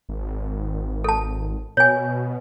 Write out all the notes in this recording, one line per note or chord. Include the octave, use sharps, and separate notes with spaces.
G#1
A4 A5
B2 C#5 G#5